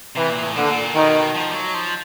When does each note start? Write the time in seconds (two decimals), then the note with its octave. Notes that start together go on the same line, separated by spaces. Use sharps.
0.16 C3 E3
0.30 A#2
0.43 A2
0.56 A#2 D3
0.95 B2 D#3
1.35 F3
1.50 G3
1.54 F#3
1.74 F3